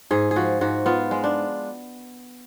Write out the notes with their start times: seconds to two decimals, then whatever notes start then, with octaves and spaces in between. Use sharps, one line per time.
0.11 G#2 G#4
0.31 G#4
0.36 F3 F#4
0.61 G#2 F#4
0.86 B3 F4
1.11 G#3
1.24 D4